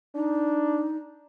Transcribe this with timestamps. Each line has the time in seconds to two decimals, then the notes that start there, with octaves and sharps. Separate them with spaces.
0.15 D4 D#4